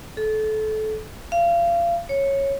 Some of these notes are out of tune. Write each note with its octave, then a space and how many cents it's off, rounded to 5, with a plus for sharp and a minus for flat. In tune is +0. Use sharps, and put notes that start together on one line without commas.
A4 -25
F5 -30
C#5 -10